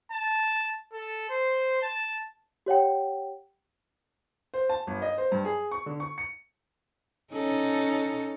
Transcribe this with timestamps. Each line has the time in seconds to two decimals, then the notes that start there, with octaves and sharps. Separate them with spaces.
0.11 A5
0.92 A4
1.29 C5
1.82 A5
2.66 G4 C#5 F#5 G5
4.54 C5
4.69 A5
4.87 G1
5.02 D#5
5.18 C5
5.32 G2
5.45 G#4
5.71 C#6
5.86 D3
6.00 C#6
6.18 C#7
7.32 C#4 D#4 A4